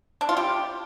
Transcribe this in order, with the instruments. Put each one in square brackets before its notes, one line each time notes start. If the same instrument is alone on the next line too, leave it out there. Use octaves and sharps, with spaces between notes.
[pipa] D4
F4
G4